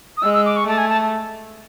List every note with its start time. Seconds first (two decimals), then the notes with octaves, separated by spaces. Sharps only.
0.17 D#6
0.22 G#3 E6
0.33 E6
0.46 D6
0.56 C#6
0.67 A3 A5
0.78 G#5
0.89 A5